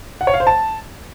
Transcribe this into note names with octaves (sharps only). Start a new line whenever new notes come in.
F#5
C#5
F5
C5
A5